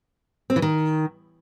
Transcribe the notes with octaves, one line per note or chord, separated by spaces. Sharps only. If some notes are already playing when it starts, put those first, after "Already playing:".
C4
E3
D#3